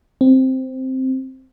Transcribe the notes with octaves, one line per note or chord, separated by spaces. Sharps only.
C4